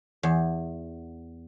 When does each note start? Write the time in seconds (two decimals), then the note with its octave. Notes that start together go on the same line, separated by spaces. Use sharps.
0.23 E2